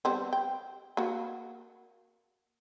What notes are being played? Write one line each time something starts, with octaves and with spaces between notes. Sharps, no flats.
G3 B3 C4
G5
A#3 F#4